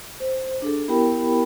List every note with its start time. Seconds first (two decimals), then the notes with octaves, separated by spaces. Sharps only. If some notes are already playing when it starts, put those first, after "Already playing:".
0.20 C5
0.62 D4 G#4 A4
0.88 B3 E4 G4 A#4 G5 B5